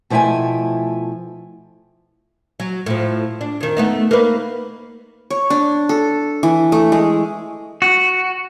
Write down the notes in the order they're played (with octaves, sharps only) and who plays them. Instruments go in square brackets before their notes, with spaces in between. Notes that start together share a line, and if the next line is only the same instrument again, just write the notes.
[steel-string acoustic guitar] B2 F3 A3 E4 G5 G#5
[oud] F#3
A2 F3
D4
F2 D#3
A3 B3 D#4
A#3 D#4 B4
[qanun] C#5
D4
A4
E3
A3
G#3
[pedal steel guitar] F#4